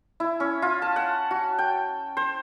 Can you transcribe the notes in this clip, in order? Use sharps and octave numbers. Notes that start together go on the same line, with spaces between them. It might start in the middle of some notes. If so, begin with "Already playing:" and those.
E4
C#4
F4
A5
F#5
F#4
G5
C5